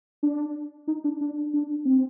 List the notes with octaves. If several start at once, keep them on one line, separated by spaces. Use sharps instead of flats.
D4
D#4
D4
D4
D4
C4